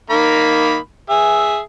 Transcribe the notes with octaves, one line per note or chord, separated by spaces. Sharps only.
D#3 A#3 B5
G#4 E5